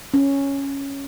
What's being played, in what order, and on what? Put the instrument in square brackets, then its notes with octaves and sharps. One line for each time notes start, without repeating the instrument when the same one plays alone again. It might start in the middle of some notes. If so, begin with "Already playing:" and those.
[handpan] C#4